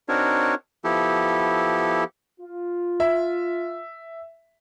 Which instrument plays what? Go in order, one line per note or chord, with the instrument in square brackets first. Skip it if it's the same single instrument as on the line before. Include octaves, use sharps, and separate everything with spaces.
[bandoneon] C4 D4 D#4 F#4 A#4 C#5
F3 B3 E4 G4 A4
[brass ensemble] F4
[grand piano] E5